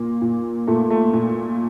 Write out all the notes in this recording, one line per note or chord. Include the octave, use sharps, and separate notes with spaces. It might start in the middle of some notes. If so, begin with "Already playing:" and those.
Already playing: A#2 A#3
A#2
A#2 A3
A3
A#2